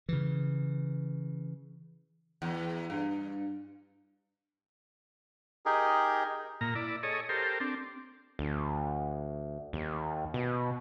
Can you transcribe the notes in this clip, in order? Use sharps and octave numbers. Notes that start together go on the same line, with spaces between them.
C#3 E3
E2
G2
D#4 G4 G#4 A#4
A#2 A#5
E4 D5
G#4 A4 C#5 D#5
G4 A4 A#4 C5
C4 D4
D2
D#2
B2